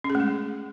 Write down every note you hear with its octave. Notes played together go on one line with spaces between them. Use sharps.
C#4
G#4
A3
G#3